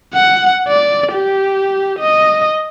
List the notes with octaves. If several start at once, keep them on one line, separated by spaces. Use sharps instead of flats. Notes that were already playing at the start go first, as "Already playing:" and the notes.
F#5
D5
G4
D#5